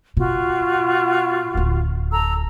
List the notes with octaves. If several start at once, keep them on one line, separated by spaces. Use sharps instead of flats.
B2 F4 F#4
D1 D2
A4 A#5 E6